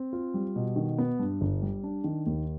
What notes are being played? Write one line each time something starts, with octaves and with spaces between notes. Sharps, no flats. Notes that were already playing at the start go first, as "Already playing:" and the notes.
Already playing: C4
F4
G3
B2
D#3
B3
G2
G1
G3
D4
D#3
D#2